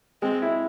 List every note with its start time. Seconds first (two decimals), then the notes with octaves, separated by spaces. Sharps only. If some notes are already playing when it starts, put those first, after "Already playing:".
0.22 G#3 C4
0.42 E4